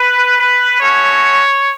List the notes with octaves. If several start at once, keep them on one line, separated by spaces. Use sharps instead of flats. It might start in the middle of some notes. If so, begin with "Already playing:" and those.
Already playing: B4
B4
A3 C#4 F#4 C#5